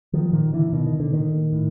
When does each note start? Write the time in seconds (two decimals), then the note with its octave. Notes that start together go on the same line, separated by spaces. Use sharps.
0.13 D#3 F3
0.32 A#2 D#3
0.53 D3 E3
0.72 B2 D#3
0.86 D#3
1.00 D3
1.13 A#2 D#3
1.53 A2